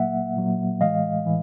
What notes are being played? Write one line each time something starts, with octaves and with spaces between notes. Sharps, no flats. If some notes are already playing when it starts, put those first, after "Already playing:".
Already playing: A#2 F#3 A#3 E5 F#5
A#2 F#3 A#3
A2 E3 G#3 D#5 F5
A2 E3